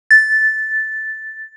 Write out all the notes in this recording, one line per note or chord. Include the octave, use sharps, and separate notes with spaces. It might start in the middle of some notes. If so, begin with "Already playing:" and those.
A6